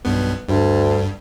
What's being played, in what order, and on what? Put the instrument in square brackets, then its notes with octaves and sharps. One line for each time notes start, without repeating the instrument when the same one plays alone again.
[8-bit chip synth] B1 G2 B3
[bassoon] D2 [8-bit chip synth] G2